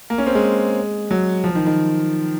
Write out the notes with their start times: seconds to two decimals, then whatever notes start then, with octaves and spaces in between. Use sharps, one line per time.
0.10 A#3
0.18 C#4
0.27 C4
0.35 G#3
1.11 F#3
1.44 F3
1.55 D#3
1.66 D#3